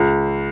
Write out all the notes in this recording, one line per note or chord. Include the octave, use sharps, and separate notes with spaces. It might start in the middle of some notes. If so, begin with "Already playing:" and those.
Already playing: C#2